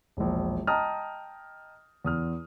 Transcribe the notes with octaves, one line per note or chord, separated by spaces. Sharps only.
E1 A#1
D#5 G5 A5 A#5 D#6 F6
E2 D#6 F6